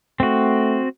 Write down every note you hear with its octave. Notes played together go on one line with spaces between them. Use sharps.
A3 C4 F#4